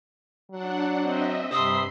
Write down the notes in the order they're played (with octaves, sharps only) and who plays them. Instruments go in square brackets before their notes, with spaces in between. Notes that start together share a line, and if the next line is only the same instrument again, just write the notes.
[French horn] F#3 [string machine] D4 F#5
[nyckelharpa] C4 [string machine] D#5 E5
[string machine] G2 B5 C7 [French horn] C3 [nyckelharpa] E5 C6 [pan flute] D#6